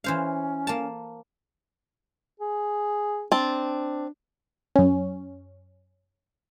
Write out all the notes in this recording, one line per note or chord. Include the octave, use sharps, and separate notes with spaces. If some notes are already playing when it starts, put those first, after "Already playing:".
E3 C#4 C5 F5
A#3 A5
G#4
C4 D4 A5
F#2 C#4